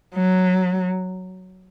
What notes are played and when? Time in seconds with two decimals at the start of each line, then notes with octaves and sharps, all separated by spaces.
0.15 F#3